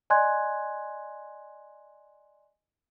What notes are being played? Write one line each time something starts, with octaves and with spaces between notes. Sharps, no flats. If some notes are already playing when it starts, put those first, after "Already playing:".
D5 D#5 G#5 C6 F#6 G#6